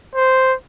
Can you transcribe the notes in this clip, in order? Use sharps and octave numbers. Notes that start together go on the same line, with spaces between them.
C5